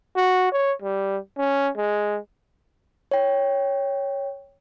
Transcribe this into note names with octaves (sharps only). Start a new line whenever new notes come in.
F#4
C#5
G3
C#4
G#3
C#5 G5